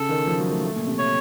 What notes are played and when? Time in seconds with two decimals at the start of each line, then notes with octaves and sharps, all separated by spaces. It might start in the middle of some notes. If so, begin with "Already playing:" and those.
Already playing: C#3 A4
0.09 D#3
0.27 F3
0.40 F#3
0.51 A3
0.64 A3
0.76 A#2
0.87 C3
0.99 C#5